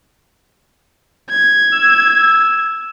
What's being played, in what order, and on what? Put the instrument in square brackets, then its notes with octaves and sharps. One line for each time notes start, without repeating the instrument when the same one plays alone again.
[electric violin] G#6
[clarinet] E6